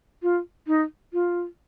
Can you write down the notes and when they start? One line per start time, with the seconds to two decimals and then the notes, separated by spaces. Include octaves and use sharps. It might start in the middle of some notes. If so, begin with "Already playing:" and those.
0.23 F4
0.67 D#4
1.13 F4